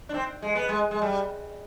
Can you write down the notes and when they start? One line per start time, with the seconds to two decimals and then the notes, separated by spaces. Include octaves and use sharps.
0.09 D4
0.14 C4
0.42 G#3
0.55 B3
0.69 G#3
0.91 G#3
1.02 G3